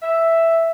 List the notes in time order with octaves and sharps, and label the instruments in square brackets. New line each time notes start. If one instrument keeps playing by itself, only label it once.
[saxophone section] E5